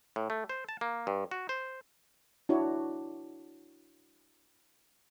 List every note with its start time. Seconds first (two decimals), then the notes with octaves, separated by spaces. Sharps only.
0.16 A2
0.30 A3
0.49 C5
0.69 A5
0.81 A#3
1.07 G2
1.31 F#4
1.49 C5
2.49 D4 E4 F#4 C#5